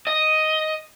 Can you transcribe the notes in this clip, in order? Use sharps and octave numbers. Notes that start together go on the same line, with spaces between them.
D#5